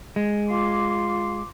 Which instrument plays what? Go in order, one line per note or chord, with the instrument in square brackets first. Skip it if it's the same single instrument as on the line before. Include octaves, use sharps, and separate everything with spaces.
[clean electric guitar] G#3
[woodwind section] F4 C6 D6